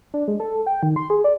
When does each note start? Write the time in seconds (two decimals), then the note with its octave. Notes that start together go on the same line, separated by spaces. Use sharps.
0.14 D4
0.28 G#3
0.40 A4
0.67 G5
0.83 D#3
0.96 C6
1.10 G#4
1.24 D5